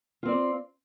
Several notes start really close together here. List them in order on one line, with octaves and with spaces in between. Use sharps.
F4 C4 D5